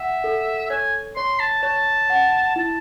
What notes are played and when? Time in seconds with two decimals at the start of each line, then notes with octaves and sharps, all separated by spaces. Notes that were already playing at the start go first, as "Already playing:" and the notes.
Already playing: E5 F#5
0.24 A4
0.70 C#5 G#5
1.16 C#5 C6
1.40 A5
1.63 C#5 A5
2.10 F#5
2.56 E4 A5